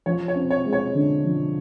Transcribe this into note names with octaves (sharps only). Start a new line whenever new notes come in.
F3 C#5
C#5
C4
C#5
G#3
C#5
D3
F3